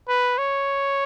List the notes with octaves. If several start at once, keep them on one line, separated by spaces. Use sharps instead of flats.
B4
C#5